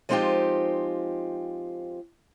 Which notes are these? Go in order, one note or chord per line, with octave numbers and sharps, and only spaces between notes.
F3 G#3 C4 D#4 F4 G4